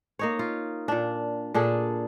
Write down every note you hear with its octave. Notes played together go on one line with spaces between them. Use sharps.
A#3 D#4 C#5
F4
A#2 D4
A#2 D4 G#4 A4